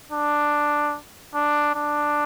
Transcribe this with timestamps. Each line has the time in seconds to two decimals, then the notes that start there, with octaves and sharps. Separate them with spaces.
0.12 D4
1.35 D4
1.75 D4